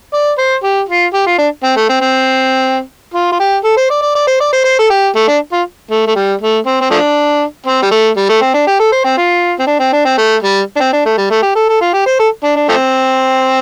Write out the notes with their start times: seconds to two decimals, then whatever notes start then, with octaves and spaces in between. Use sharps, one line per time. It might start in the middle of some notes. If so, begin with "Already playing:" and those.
0.13 D5
0.38 C5
0.63 G4
0.89 F4
1.14 G4
1.26 F4
1.38 D4
1.63 C4
1.76 A3
1.89 C4
2.01 C4
3.14 F4
3.32 F4
3.40 G4
3.64 A4
3.77 C5
3.90 D5
4.02 D5
4.15 D5
4.27 C5
4.40 D5
4.52 C5
4.64 C5
4.79 A4
4.90 G4
5.15 A3
5.28 D4
5.53 F4
5.91 A3
6.07 A3
6.16 G3
6.41 A3
6.66 C4
6.81 C4
6.91 F3 A3 D4
7.66 C4
7.82 G3
7.91 A3
8.16 G3
8.29 A3
8.41 C4
8.54 D4
8.67 G4
8.79 A4
8.92 C5
9.04 C4
9.18 F4
9.59 C4
9.67 D4
9.79 C4
9.93 D4
10.05 C4
10.18 A3
10.43 G3
10.76 D4
10.80 C4
10.93 D4
11.06 A3
11.18 G3
11.31 A3
11.43 G4
11.55 A4
11.69 A4
11.81 F4
11.93 G4
12.06 C5
12.19 A4
12.44 D4
12.56 D4
12.69 F3 A3 C4